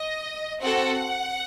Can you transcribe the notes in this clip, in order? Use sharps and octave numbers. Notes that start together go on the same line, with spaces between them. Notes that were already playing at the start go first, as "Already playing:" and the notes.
Already playing: D#5
C4 F#4 A4 F#5